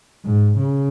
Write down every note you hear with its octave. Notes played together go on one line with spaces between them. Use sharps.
G#2
C#3